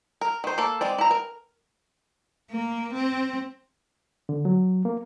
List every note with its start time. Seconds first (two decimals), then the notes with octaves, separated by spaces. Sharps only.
0.21 A#4
0.44 D#3 C5
0.58 A#3 A4
0.81 G#3 C4 D5
0.98 E4 A#5
1.11 A#4
2.51 A#3
2.93 C4
4.29 D3
4.45 F#3
4.85 A#3